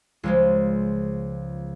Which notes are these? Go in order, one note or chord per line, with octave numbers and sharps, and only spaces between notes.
C#2 F3 G#3